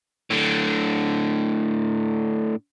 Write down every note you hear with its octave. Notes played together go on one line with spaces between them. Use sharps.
A2 D3